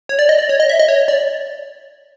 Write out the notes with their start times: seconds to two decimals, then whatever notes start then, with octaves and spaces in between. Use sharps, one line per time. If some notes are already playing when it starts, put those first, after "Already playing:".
0.09 C#5
0.19 D5
0.29 D#5
0.39 D5
0.49 C#5
0.60 D#5
0.69 E5
0.79 D#5
0.88 C#5
1.08 D5